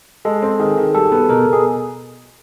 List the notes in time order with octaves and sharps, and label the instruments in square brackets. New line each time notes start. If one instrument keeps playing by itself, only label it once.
[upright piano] G#3 [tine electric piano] A4
[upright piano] C4
[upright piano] D#3 [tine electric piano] G#4
[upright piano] D#3
[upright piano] G3 [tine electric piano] A4
[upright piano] B3
[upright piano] B2 [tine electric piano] A#4
[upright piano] B2
[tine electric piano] G#4